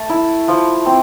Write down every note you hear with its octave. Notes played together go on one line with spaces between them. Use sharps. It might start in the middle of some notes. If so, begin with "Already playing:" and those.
Already playing: A3 A5
E4
F3
C4